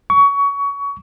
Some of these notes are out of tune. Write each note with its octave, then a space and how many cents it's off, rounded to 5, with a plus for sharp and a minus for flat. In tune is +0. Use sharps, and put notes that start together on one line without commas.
C#6 +25